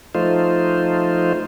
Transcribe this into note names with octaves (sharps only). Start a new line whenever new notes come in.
F3 A3 D#4 F4 C5